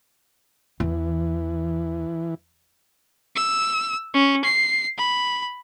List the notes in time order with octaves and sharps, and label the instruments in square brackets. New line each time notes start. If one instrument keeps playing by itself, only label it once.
[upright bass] E2 [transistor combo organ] E3
[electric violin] E6
C#4
C7
B5